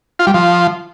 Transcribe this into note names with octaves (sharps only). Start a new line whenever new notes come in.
F4
G3
F3